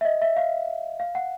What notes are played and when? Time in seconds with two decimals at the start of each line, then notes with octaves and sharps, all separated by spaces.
0.01 E5
0.05 D#5
0.22 E5
0.37 F5
1.00 F5
1.15 F#5